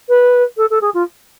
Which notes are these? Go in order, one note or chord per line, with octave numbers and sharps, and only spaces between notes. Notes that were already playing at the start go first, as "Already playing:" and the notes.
B4
A4
A4
G#4
F4